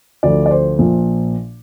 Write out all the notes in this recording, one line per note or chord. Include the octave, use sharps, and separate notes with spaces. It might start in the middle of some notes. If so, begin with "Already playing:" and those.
D2 D3 F3 D5
D5
C5
A#1 A#2 F3